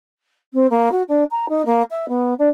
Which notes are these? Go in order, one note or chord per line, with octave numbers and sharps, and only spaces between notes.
C4
A#3
F#4
D4
A#5
D#4
A#3
E5
B3
D4